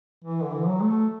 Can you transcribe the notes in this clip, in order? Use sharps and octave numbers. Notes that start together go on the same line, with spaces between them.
E3
D3
E3
F#3
A3